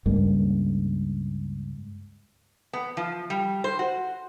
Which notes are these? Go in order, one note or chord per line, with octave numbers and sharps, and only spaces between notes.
C#2 G2 G#3 A#3
B3
F3
G3
C5
F#4